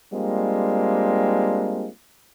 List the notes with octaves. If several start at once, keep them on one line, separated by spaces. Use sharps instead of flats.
G3 G#3 A#3 C4 D4 F4